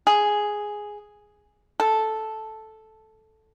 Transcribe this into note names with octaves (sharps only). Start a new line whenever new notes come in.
G#4
A4